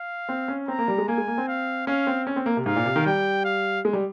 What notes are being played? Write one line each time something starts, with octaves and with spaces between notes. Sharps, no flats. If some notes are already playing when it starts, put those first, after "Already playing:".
Already playing: F5
C4
C#4
C4 A#5
A#3
G3
G#3
A#3 G#5
G#3
A#3
C4
F5
C#4 F5
C4
C#4
C4
A#3
C3
G#2 F5
A#2
C3
D#3
G3 G5
F5
G#3
G3